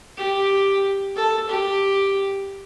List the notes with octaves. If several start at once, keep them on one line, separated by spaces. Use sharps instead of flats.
G4
A4
G4